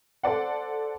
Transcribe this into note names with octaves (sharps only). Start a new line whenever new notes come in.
A4 C5 D5 F#5